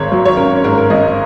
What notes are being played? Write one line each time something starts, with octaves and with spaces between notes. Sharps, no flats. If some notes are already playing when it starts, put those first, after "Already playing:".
Already playing: G#1 G#2 A#4 C#5
F#3
C#5
C#4 A#4
G#2 A#4
A#4
G#1 D#5